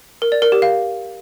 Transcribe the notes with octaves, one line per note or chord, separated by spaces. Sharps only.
A#4
D5
A#4
G4
F5